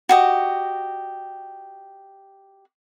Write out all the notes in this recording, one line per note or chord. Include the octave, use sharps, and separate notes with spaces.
F#4 G4 D#5